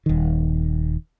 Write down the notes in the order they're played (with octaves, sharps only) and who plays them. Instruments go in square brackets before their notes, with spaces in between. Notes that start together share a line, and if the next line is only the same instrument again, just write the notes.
[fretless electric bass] D#1 D#3